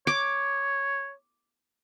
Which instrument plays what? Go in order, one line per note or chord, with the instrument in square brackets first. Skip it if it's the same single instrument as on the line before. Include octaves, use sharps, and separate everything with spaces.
[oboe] C#5 [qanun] D6